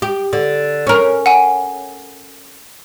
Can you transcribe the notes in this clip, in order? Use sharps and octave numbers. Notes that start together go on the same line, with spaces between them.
G4
D3
C#4 A#4
F#5 G#5